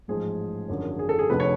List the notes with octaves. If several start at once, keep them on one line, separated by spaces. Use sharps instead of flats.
A1 G#2 F3 G#4
G#1 F#2 D3 F3
G#4
A4
G#4
F1 F2 D3 F3 B4
C#5